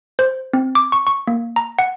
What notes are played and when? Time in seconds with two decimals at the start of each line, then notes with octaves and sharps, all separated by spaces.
0.19 C5
0.53 C4
0.75 D6
0.92 C#6
1.07 C#6
1.27 A#3
1.56 A#5
1.79 F#5